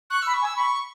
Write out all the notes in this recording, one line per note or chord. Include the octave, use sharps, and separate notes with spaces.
C#6 F#6
B5 E6
C#6
G#5
E6
B5 C#6